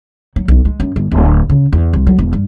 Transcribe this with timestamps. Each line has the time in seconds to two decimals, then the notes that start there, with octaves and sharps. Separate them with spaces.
0.36 F#3
0.48 B1
0.65 G#3
0.80 F#2
0.96 G1
1.11 D1
1.50 C#3
1.73 E2
1.93 C2
2.07 F#3
2.18 E1
2.33 G2